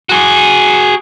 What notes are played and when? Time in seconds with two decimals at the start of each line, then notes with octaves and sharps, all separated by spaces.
0.09 F#4 G#4